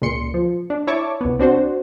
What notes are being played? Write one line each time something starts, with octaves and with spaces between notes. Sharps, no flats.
C#2 A#2 C6 C#7
F3
D4
E4 C#5 A5 C#6 D6
C2 B3
C4 D4 F#4 C5